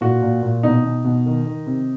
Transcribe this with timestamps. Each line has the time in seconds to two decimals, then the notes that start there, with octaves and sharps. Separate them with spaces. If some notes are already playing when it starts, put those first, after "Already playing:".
0.01 A#2 F#4
0.22 A#2
0.42 A#2
0.63 B2 D#4
0.84 B2
1.05 B2
1.26 D#3
1.46 D#3
1.67 C3